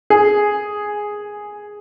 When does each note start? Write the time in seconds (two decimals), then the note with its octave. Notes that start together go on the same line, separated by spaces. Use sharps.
0.10 G#4